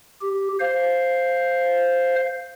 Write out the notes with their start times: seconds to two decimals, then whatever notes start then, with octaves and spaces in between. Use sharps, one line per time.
0.21 G4
0.60 C5 F5